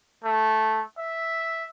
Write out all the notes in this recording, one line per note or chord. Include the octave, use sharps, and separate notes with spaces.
A3
E5